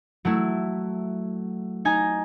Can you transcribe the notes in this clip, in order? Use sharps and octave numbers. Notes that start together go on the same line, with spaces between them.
F#3 A3 E4
D#4 G#5 A#5